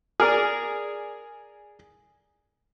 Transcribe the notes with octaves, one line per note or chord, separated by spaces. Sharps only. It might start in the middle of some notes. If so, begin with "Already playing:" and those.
G#4 A#4 D5